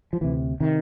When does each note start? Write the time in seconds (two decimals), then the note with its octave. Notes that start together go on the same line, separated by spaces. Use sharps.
0.13 F3
0.21 D2 C3 E3
0.60 C3 D#3